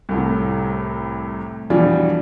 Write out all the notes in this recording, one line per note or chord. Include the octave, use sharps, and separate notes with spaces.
C2 A2 C3
F2 B2 E3 F3 G3 D4